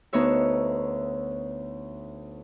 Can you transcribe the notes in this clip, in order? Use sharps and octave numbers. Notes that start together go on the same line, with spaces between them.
D2 B3 D#4 C#5 E5